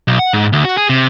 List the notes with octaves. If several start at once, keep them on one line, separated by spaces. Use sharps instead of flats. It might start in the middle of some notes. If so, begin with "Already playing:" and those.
B1
F#5
G#2
D2
F#4
G#4
C3